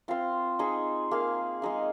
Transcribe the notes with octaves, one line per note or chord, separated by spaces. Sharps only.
C4 F4 C5 F5
D#4 G#4 C5
A#3 G#4 F5
G#3 D#4 G#4 F5